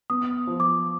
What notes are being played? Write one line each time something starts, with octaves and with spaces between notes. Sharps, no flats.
B3 D#6
F3
D6